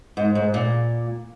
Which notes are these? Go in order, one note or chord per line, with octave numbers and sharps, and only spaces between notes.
G#2
G#2
A#2